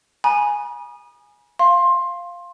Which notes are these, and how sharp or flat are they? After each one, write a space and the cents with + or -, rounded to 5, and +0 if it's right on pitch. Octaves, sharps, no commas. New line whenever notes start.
G#5 +0 B5 -45 D#6 -30
F5 +0 C6 +20